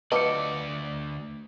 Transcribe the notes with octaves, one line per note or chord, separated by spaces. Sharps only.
D2 F3 F#3 B4 D5 D#5 D6 C#7